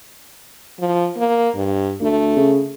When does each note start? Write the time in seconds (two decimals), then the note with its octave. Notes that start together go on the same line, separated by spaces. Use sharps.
0.80 F3
1.17 A#3
1.55 G2
2.01 D2 A3
2.36 C#3